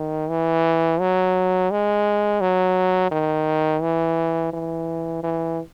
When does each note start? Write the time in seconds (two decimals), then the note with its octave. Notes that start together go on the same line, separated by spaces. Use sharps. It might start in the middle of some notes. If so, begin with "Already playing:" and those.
Already playing: D#3
0.30 E3
1.00 F#3
1.71 G#3
2.41 F#3
3.11 D#3
3.82 E3
4.53 E3
5.23 E3